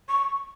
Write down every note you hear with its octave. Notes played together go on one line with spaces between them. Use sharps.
C#6